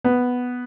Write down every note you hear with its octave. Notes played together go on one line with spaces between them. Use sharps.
B3